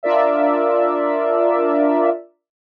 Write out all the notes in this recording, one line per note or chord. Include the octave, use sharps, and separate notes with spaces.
D4 F4 A#4 D5 E5